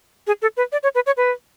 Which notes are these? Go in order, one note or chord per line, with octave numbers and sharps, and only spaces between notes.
G#4
A4
B4
D5
C#5
B4
C#5
B4